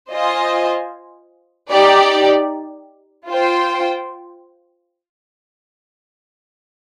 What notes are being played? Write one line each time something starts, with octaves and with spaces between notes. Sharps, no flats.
F4 C5 D#5 G#5
D#4 G4 D5
F4 C5 G5